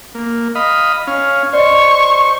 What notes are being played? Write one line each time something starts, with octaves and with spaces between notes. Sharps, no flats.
A#3
D#5 F5 B5
C#4 F5
C5 D5 D#5 C#6